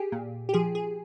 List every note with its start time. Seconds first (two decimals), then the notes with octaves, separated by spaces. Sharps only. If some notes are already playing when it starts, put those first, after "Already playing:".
Already playing: G4 G#4
0.12 A#2
0.49 G4
0.53 F3 G#4
0.75 G#4